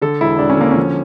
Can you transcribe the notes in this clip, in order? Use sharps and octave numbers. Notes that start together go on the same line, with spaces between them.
D3 A4
E1 E4
E1 D4
C#4
D3 A#3
C#4
F3